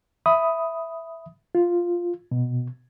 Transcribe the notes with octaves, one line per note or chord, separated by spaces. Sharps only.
E5 B5 D#6
F4
B2